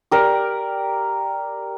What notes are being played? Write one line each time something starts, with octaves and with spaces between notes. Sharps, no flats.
G4 A#4 D5